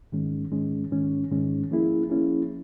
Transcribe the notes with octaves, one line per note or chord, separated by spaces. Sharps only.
G#2 D#3 G#3 C#4
G#2 D#3 G#3 C#4
G#2 D#3 G#3 C#4
G#2 D#3 G#3 C#4
F3 A#3 C#4 E4 G#4
F3 A#3 C#4 E4 G#4